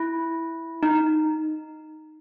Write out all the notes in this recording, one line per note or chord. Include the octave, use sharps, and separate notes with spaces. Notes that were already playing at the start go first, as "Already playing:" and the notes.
Already playing: E4
D#4